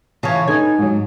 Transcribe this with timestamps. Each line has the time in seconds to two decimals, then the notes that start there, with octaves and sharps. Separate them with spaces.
0.23 C#3 E3 F4 C#5 A5
0.48 D#4 A4 B4 G#5
0.78 G#2 F#3